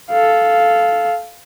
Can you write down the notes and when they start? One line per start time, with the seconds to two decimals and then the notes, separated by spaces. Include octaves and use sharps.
0.10 A4 F5